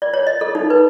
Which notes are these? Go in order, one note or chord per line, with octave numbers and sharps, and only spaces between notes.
D5
C#5
D#5
A4
D#4
B4